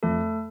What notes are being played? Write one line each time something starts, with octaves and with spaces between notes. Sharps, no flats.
F2 A3 A4